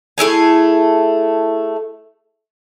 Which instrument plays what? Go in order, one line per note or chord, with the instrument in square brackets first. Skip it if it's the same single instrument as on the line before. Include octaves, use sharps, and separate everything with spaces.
[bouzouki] A3 E4 G#4 G#5